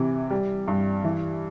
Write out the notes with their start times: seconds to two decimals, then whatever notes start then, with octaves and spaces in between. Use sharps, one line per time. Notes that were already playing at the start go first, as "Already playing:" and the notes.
Already playing: C3 E3
0.30 G3
0.68 G2
1.04 E3